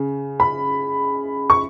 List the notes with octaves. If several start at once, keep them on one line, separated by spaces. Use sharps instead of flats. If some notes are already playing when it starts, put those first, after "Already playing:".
Already playing: C#3
B5
C#6